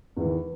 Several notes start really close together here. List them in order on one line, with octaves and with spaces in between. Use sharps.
E2 E3 D#3